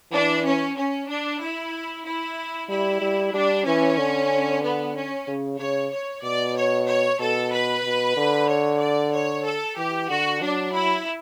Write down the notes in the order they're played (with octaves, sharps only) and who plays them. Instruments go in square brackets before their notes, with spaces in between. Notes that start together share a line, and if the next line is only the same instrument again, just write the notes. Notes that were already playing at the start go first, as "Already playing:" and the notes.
[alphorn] E3 [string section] D4
[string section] C#4
C#4
D4
E4
E4
[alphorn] G3 [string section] E4
[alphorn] G3
[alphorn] G3 [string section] D4
[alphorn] E3 [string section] C#4
[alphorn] D3
[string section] B3
C#4
[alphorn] C#3
[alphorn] C#3 [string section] C#5
[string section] C#5
[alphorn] B2 [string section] D5
[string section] C#5
C#5
[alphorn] B2 [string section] A4
[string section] B4
[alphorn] B2
D3
[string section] C#5
D5
C#5
A4
[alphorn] E3 [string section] G4
[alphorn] D3 [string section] F#4
[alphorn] F#3 [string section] D4
[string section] E4